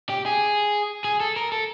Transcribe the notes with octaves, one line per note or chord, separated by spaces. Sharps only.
G4
G#4
G#4
A4
A#4
A4